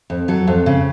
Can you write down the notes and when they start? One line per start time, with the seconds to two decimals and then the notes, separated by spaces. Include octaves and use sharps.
0.10 F2
0.28 F#3 A4
0.47 F2
0.66 C#3